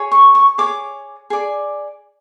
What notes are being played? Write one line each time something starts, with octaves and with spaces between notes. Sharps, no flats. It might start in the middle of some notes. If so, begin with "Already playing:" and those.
Already playing: G#4 C#5
C#6
C#6
G#4 C#5 D6
G#4 D5